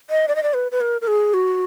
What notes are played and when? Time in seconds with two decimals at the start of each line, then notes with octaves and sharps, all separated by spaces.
0.10 D#5
0.28 D5
0.36 D#5
0.43 D5
0.54 B4
0.72 B4
0.81 A#4
1.01 A#4
1.08 G#4
1.34 F#4